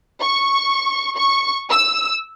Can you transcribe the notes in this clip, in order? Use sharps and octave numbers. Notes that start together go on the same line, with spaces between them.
C#6
C#6
E6